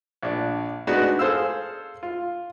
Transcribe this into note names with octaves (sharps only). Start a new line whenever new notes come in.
A#1 D4
G#3 B3 D4 D#4 F#4
G#4 A4 C5 F5 E6
F4